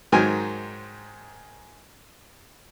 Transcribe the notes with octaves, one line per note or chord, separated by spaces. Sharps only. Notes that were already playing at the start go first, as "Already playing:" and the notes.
G#2 D#3 F#3 A#4 C5 G#5